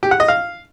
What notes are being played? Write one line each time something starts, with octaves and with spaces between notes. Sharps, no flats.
G4
F#5
D#5
F5